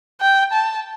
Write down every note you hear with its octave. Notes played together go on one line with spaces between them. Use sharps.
G5
A5